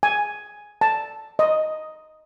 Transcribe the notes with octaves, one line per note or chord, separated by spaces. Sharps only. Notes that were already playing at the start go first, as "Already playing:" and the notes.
G#5
A5
D#5